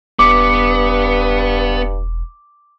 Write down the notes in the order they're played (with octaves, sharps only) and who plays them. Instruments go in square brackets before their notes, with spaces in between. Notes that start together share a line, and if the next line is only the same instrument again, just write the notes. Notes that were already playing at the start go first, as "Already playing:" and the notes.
[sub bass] E1 [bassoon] G2 [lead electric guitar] B3 [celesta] D6